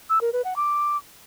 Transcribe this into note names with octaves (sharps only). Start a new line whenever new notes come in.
E6
A#4
B4
F#5
D6